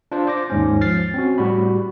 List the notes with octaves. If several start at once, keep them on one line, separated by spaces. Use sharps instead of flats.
D4 F4 C5 D5
C5 D6 A#6
D#2 G#2 C#4
F3 F6 A6 C7
C4 C#4 F#4
A2 G3 F#4 B5